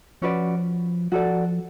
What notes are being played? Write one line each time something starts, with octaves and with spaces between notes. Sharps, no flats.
F3 C#4 F#4 B4 D5
F3 F#4 A4 D5